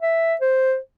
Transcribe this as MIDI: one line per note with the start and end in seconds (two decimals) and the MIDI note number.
0.01 0.35 76
0.41 0.77 72